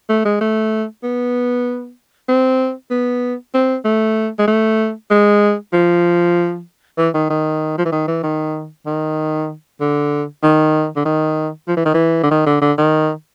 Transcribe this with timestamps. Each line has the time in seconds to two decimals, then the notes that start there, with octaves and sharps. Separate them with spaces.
0.09 A3
0.25 G#3
0.41 A3
1.03 B3
2.29 C4
2.91 B3
3.54 C4
3.85 A3
4.39 G#3
4.48 A3
5.11 G#3
5.73 F3
6.98 E3
7.14 D#3
7.30 D#3
7.78 F3
7.85 E3
7.92 D#3
8.08 E3
8.24 D#3
8.86 D#3
9.81 D3
10.43 D#3
10.96 D3
11.06 D#3
11.68 F3
11.77 E3
11.85 D#3
11.94 E3
12.23 D3
12.31 D#3
12.46 D3
12.62 D3
12.78 D#3